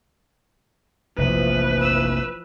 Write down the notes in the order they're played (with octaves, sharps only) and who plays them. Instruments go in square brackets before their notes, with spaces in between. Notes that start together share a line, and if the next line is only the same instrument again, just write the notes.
[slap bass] F1 A#1 [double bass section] E3 F3 [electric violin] B4
[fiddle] E6